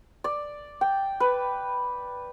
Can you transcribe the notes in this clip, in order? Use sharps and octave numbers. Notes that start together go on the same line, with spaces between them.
D5
G5
B4